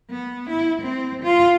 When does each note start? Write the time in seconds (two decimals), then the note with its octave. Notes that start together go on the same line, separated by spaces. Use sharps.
0.10 B3
0.50 E4
0.82 C4
1.24 F4